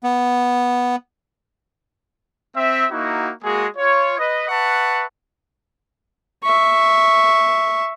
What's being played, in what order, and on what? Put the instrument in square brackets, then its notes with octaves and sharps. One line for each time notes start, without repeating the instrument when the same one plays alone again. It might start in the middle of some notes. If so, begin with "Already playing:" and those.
[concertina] B3
[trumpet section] C4 E5
A#3 D#4 E4 F#4
G#3 A#3 F#4 G#4
F4 C#5
B4 D#5
B4 E5 F#5 A5 C#6
[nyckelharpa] E5 C#6